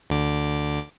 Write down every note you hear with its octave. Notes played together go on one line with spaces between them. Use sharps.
D2 D3 D6